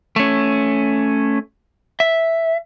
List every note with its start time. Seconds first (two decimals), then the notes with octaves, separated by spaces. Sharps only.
0.16 A3 C#4
2.00 E5